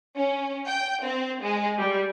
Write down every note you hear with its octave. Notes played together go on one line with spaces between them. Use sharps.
C#4
G5
C4
G#3
G3